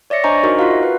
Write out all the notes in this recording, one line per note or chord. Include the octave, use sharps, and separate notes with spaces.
C#5 D5 E5 A#6 C#7
D4 C5 D#5 G#5 A#5 C#6
D#4 F#4 A#4 C5 D#5
F4 F#4 F5
E5
B4